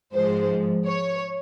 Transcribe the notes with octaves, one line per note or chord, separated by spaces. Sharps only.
G#2 F3 G#3 C5
C#5